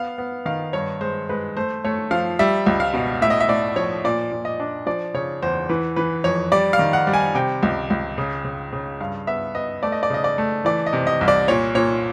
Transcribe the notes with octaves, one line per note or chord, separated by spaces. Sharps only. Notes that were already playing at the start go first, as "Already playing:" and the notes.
Already playing: B3 F5
B3
D#3 F5
G2 C#5
G#3 C5
G#3 B4
A3 C5
A3 C#5
F3 F5
G3 E5
C#2
F5
B2
A2 E5
D#5
E5
A2 D5
F3 C#5
A#2 D5
A#2
D#5
D4
F3 D5
C#3 C#5
E2 C5
E3 B4
E3 B4
F2 C#5
G3 D5
F5
D#3
F#5
G3
G#5
C3 G5
C#2
C#2
C#3
C#3
C#3
G2 F5
B3 E5
B3 D#5
A3 D5
D#5
D5
C#3 D#5
D5
A3
E3 D5
D#5
C3
D#5
C2
D5
A#2 C#5
A#2 C#5